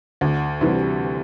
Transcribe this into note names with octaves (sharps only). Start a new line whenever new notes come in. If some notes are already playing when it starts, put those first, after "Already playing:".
D2
C3 E3 G3